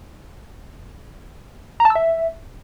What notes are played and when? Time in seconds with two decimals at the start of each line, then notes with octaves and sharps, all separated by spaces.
1.80 A#5
1.85 A5
1.90 E6
1.95 E5